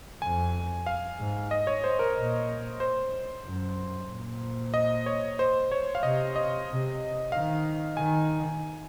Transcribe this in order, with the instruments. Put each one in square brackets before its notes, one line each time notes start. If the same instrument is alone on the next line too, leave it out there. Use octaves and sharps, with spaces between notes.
[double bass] F2 [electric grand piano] G#5
[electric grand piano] F5
[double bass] G#2
[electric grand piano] D#5
C#5
C5
A#4
[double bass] A#2
[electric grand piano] C5
[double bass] F#2
A#2
[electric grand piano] D#5
C#5
C5
C#5
F5
[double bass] C3 [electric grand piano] D#5
[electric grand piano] D#5
[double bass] C3
[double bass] D#3 [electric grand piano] F5
[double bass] D#3 [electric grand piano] G#5